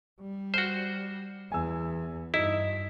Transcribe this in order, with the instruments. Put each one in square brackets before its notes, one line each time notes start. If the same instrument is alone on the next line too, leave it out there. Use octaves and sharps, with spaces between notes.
[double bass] G3
[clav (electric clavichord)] F#4 C5 [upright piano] F6
[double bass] E2 [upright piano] G#5 E6
[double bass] G2 [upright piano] D#4 [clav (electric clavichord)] E4